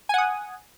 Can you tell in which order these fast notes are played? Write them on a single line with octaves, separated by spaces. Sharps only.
G#5 F#5 D#6